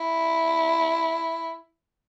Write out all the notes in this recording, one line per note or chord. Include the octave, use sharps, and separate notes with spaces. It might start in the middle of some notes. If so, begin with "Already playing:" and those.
Already playing: E4